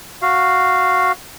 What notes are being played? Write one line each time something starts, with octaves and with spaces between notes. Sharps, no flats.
F#4 F5